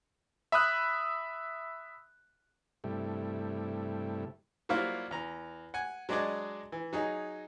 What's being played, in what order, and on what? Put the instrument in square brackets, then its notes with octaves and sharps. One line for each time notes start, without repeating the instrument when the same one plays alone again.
[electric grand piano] E5 B5 D#6 F#6
[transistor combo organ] G2 C3 G3 A3 E4
[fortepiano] F#3 G3 A#3 E4 F4 C5
E2 A#5
F#5 G#5
F#3 G#3 D4 G#4 D5 D#5
E3
F#3 D#4 G#4